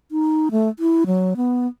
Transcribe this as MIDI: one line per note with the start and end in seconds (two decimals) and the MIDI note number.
0.12 0.49 63
0.51 0.69 57
0.79 1.04 64
1.06 1.34 54
1.37 1.67 59